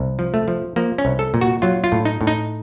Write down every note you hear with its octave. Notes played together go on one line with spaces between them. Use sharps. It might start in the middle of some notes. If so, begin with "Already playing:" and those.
Already playing: C2
F3
A3
F3
F3 A#3
C#4
C2
A4
A#2
F#4
F#3 F4
F4
A2
D#4
A2
D#4